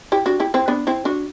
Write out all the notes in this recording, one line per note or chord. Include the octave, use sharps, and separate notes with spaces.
E4 G4
D4 F#4
E4 G4
C4 E4
B3 D4
C4 E4
D4 F#4